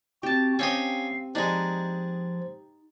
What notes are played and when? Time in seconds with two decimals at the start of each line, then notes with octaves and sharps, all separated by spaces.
0.23 C4 F#4 G4 A5
0.59 C4 C#4 G4 D#5 F5
1.35 F3 G#3 D4 D#4 G4